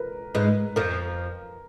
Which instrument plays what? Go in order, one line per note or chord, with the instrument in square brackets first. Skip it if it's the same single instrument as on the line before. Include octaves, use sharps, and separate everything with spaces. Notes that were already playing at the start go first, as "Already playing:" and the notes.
Already playing: [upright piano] A#4 B4
[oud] G#2 G#3 [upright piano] B4
[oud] F2 F3 [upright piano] A#4